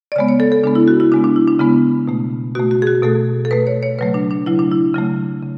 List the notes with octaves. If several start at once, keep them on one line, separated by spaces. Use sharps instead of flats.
D5
C#3 G#3 B3 C#5
C#5
A4
A4
C#3 G#3 B3 D4
E4
F#4
E4
C#3 G#3 B3 D4
D4
E4
D4
C#3 G#3 B3 E4
B2 A3
B2 A3 F#4
F#4
G#4
F#4
B2 A3 A4
A4
B2 A3 B4
C#5
C#5
C#3 F#3 A3 B4
D4
D4
C#3 F#3 A3 E4
D4
E4
C#3 F#3 A3
C#3